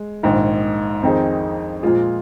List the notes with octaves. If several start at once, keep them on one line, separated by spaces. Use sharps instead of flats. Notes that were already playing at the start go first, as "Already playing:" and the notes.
Already playing: G#3
A#1 G#2 D#3
F2 D#3 C4 D#4 G#4
A#2 F3 G#3 F4 G#4